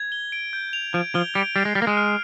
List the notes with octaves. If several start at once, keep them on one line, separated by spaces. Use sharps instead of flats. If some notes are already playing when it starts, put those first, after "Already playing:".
Already playing: G#6
G7
D7
G6
F7
F3 D7
F3 G7
G3 D7
G3 C7
G#3
G3 F6
A#3
G#3
F6